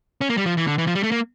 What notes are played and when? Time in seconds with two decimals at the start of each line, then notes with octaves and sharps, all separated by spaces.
0.21 C#4
0.30 A#3
0.37 G3
0.46 F3
0.57 E3
0.67 D3
0.78 E3
0.87 F3
0.95 G3
1.03 A3
1.12 A#3